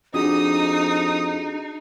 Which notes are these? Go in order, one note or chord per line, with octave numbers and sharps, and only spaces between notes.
F2 D4 D#4 F#4 G#4 D#6